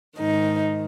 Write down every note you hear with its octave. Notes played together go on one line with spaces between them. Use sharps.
G#2 D#3 D#4